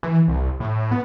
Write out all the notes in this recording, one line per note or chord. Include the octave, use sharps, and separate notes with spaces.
E3
C2
A2
B3